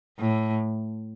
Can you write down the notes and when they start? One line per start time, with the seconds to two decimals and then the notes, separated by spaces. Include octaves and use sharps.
0.19 A2